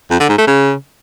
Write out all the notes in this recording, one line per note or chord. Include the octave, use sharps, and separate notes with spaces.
F2
D3
G#2
A3
C#3